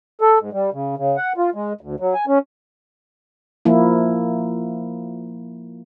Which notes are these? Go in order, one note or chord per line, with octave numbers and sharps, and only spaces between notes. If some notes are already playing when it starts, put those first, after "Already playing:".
A4
G#2
G3
C#3
C#3
F#5
F4
G#3
D2
F#3
G#5
C#4
F3 A#3 E4